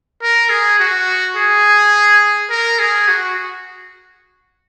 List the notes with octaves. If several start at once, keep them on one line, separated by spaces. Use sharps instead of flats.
A#4
G#4
F#4
G#4
A#4
G#4
F#4